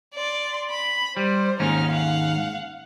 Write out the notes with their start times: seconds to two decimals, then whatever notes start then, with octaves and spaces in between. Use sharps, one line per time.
0.14 D5 C6
0.70 B5
1.17 G3 C5
1.60 D#2 G#2 C#4 D#4 F6
1.91 F5 F#5